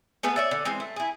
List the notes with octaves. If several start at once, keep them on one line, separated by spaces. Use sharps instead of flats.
A3 B3 G#4 B4
C#5 D5 E5
D3
E3 G#3 C4
A3
E4 G#4